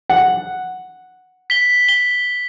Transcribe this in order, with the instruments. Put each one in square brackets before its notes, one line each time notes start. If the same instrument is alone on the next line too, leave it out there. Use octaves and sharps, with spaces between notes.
[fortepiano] F#5
[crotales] B6 G7
G7